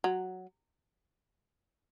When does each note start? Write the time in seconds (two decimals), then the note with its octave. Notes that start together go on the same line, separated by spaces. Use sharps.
0.04 F#3